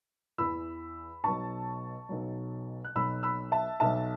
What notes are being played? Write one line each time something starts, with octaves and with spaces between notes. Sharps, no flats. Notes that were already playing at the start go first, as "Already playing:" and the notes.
E2 E3 B5 E6
B1 B2 F#3 A5 C#6
B1 B2 F#3
F#6
B1 B2 F#3 B5 E6
B5 E6
E5 A5
B1 B2 F#3 E5 A5